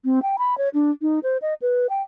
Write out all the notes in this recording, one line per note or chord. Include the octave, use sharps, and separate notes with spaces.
C4
G5
B5
C#5
D4
D#4
C5
D#5
B4
G5